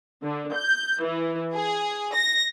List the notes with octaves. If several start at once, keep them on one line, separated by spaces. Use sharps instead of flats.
D3
G6
E3
G#4
A#6